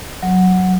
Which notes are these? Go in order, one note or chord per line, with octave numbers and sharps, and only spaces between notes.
F#3